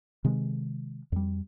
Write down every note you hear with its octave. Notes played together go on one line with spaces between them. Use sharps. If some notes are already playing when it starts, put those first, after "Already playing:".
C3 D#3 G#3
F2 G3